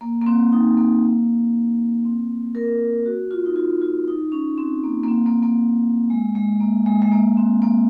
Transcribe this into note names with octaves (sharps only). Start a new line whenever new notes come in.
A#3
A#3
C4
D#4
A#3
C4
A#4
F#4
F4
D#4
F4
F4
D#4
C#4
C4
A#3
A#3
C4
A#3
A#3
G#3
G#3
A#3
G#3
G#3
A#3
C4
A#3